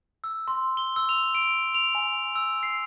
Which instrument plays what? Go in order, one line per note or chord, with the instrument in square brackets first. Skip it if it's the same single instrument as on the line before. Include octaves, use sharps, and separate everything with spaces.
[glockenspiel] E6
C6
G7
E6
F7
D7
F7
G#5
E6
C7